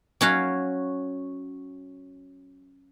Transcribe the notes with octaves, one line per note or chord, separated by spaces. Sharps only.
F#3 C#4 F#4 F5